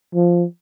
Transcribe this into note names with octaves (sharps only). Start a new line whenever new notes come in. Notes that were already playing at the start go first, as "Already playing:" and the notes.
F3